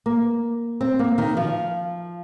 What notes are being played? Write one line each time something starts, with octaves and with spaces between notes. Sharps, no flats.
A#3
C4
A#3
D#3
F3